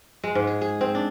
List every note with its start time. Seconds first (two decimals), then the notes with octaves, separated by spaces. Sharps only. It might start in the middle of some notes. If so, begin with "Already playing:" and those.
0.24 G#3
0.35 G#2
0.47 G#4
0.61 G#4
0.81 C4
0.95 D4